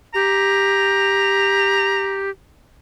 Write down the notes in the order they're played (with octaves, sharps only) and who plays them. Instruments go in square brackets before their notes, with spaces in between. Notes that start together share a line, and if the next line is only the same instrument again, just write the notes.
[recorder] G4 [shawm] A#5